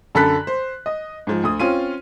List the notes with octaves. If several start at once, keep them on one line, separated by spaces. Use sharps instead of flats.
F#2 D3 A4 B5 F#6 B6
C5
D#5
G#2 F3
D2 D#6
C4 C#4 F4 D#7